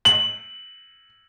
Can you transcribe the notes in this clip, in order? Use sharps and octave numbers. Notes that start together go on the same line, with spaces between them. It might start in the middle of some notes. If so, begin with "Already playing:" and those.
F#7